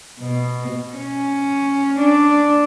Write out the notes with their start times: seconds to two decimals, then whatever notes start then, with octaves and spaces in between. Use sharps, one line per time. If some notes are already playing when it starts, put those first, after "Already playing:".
0.19 B2
0.96 C#4
1.99 D4